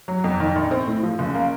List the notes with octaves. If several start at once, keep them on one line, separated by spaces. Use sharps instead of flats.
F#3
F2
D#3
A#1
C4
A2
F3
F#1
A#3